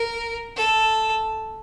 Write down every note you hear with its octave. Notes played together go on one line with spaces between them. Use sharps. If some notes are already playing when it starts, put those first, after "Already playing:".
Already playing: A#4
A4